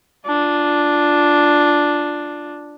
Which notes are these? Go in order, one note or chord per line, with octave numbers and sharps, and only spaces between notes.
D4 F4